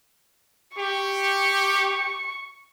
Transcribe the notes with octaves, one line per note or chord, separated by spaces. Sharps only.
G4 C#6